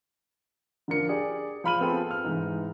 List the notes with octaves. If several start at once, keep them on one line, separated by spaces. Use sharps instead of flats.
D3 F3 D4 A#4 C#7
G4 G#4 D5
F3 F5 B5 F6 D#7 F#7
B3 C4 F4 G#4 A4 G5
F6
G#2 C3 E3 D#4